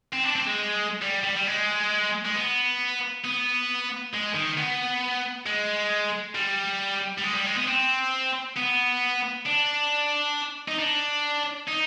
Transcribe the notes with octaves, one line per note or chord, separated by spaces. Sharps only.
C4
D4
C4
G#3
G3
G3
G3
G#3
G#3
B3
B3
G#3
D#3
B3
G#3
G3
G3
G#3
G3
G#3
B3
C4
B3
D4
D#4
D4
D#4